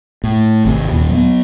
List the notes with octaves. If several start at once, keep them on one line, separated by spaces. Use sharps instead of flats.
A2
G#1 C3
D#2 A#2
F#3 G3 B3